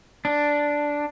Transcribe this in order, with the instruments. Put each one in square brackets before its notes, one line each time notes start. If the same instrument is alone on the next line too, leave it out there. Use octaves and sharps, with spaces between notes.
[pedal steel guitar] D4